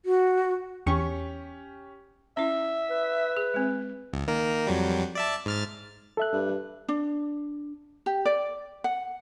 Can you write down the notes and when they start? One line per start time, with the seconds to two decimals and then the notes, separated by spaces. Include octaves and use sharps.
0.05 F#4
0.86 E2 C#4 G4 C#6
2.37 C#4 E4 E5
2.90 B4
3.37 G#4
3.54 G#3 C4
4.13 C#2
4.27 D#3 A#3 A#4
4.67 F2 F#3 G3
5.15 D5 E5 A5
5.46 G#2 F6 A6
6.17 A4 E5 F#6
6.33 G2
6.88 D4
8.06 G4
8.25 D5
8.84 F#5